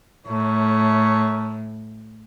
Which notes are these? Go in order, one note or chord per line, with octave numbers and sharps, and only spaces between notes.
A2 A3 A#4 C#5